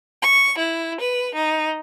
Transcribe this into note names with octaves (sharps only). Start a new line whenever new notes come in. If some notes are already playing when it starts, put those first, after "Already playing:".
C#6
E4
B4
D#4